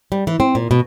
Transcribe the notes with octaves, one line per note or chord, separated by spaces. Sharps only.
G3
E3
C4
A#2
B2